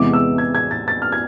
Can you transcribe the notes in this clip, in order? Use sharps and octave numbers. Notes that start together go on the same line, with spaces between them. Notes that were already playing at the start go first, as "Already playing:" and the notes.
Already playing: E2 C3 E3 G#3 B3 D6
E6
G#6
G#6
A6
A6
F6
G#6